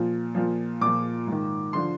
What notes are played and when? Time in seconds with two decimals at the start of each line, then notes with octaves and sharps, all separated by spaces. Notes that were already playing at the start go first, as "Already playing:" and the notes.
Already playing: A#2 F3
0.35 A#2 F3
0.81 A#2 F3 D6
1.27 G#2
1.32 D#3
1.73 D3 F3 C6